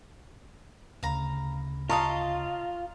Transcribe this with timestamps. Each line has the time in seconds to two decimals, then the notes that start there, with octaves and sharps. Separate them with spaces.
1.03 D2 C#3 F5 A#5 B5
1.90 F4 C#5 D#5 F5 A5 A#5